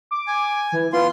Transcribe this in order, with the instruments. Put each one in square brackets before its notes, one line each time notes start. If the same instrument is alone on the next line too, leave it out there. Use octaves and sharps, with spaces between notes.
[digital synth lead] D6
[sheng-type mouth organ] G#5
[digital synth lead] E3
[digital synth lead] B3 [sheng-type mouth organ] F4 C6